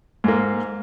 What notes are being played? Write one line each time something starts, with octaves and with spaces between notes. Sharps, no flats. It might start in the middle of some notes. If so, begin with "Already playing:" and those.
G#2 A#3